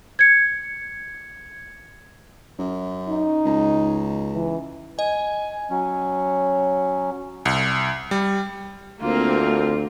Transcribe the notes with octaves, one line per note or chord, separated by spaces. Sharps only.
G#6 C#7
F#2
D#4
C#2
E3
D#5 G#5
F#3 C#4
C2
G3
D2 A#3 C4 F4 A#4